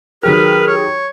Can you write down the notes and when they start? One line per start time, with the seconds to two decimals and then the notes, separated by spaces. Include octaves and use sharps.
0.23 D#3 F#3 G4 G#4 A#4 B4 F6
0.67 C#5